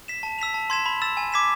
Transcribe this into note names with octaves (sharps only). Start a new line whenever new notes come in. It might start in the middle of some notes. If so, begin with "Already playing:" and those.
B6 E7
A5
E6 B6 F7
A5
C6 G#6 B6 E7
B5
E6 A6 E7
G#5
D6 G#6 B6 E7